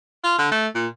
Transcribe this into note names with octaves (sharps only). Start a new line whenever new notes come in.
F4
D3
A3
A#2